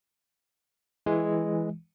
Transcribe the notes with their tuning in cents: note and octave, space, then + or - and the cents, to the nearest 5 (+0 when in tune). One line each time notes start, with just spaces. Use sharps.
E3 +0 G#3 +0